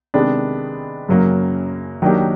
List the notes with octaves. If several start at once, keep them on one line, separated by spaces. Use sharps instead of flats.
C3 D#3 G#3 B3 D4
F#2 C#3 F#3 A#3
D#3 F#3 A#3 D4 G4